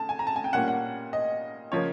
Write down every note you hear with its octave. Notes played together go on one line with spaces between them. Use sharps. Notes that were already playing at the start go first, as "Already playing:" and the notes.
Already playing: C#3 A3 A5
G#5
A#5
A5
G#5
G5
A#2 G3 A#3 C#4 F#5
F#5
D#5
C#3 F3 A#3 C#5